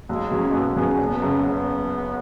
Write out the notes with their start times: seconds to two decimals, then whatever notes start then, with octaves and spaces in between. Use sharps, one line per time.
0.09 B1 G#3
0.31 B2 F#3 C#4 G#4
0.53 B1 B3
0.76 B2 F#3 B3 C#4 G#4
0.98 F#1 B3
1.22 F#2 C#3
1.43 F#1 B3